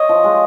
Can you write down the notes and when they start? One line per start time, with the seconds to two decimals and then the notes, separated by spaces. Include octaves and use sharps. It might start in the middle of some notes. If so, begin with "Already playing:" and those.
Already playing: C#5 D#5
0.09 F3
0.24 G#3